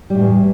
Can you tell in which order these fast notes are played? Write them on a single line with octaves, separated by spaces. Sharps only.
G3 A2 E2